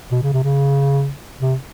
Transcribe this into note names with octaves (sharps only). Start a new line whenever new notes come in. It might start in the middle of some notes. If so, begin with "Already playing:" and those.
B2
C#3
C3
C#3
C3